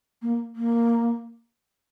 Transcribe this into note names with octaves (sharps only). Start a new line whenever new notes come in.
A#3
A#3